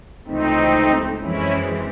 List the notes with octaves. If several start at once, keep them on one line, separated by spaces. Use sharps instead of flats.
C#2 C3 E3 A3 C4 D#4
F#2 E3 G#3 C4 C#4 E4